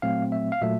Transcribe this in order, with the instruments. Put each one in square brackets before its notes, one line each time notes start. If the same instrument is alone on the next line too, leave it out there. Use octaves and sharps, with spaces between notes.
[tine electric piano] A#2 F#3 A3 C4 F5
E5
F5
A#2 F#3 A3 E5